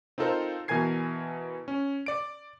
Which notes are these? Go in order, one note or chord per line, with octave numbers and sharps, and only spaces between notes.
C4 D#4 F4 A4 A#4 C5
B2 E3 A#4 G#5 G#6 C7
C#4
D5 D7